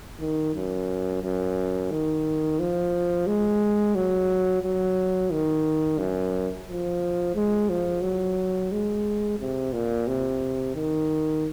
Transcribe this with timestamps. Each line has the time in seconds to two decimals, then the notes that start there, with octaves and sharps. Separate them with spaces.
0.20 D#3
0.55 F#2
1.22 F#2
1.91 D#3
2.59 F3
3.27 G#3
3.95 F#3
4.63 F#3
5.32 D#3
5.99 F#2
6.67 F3
7.35 G#3
7.69 F3
8.03 F#3
8.72 G#3
9.39 C3
9.73 A#2
10.07 C3
10.75 D#3